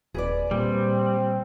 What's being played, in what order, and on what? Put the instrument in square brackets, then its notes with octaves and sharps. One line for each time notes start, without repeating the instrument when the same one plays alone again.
[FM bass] D#1 [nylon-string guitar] G#4 B4 D5
[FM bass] A#2 [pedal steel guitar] G3 [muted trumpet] C4